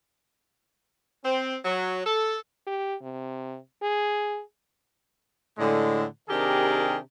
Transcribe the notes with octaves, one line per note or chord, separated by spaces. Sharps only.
C4
F#3
A4
G4
C3
G#4
A2 D3 G#3
C3 D#3 D4 G4 G#4 A#4